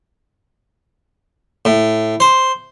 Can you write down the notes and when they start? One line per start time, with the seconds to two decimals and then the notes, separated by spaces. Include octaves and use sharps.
1.65 A2
2.20 C5